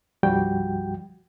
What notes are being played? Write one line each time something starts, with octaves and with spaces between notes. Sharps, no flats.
C2 G2 F3 G3 F#4 G5